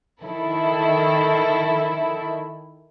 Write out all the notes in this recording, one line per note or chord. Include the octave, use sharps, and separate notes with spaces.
D#3 E4 A4